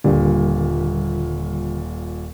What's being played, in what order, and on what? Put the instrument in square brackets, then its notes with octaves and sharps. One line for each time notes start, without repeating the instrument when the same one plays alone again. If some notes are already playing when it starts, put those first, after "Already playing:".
[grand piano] D#1 A#2 [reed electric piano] D3 G3